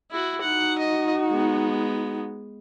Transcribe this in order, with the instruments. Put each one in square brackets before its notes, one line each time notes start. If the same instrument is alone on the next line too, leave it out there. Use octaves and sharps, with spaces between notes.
[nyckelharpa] E4 F#4
[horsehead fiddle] D#4 F#4 [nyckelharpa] F#5
[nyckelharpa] D#5
G#3 B3